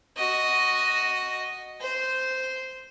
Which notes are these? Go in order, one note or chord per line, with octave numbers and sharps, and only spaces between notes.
F#4 D#5
C5